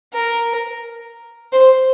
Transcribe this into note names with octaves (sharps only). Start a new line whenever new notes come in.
A#4
C5